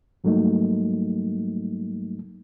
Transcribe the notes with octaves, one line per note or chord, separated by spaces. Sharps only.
G#2 F#3 G3 A3 A#3 D#4